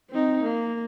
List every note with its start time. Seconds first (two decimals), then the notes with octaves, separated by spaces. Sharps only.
0.10 C4 D#4
0.43 A#3